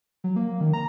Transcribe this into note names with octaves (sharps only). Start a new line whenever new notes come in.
F#3
A#3
D#3
A#5